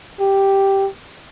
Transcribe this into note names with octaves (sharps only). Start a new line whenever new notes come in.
G4